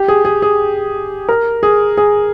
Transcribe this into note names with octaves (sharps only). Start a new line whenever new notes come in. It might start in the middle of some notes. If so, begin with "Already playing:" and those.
Already playing: G4
G#4
G#4
G#4
A#4
G#4
G#4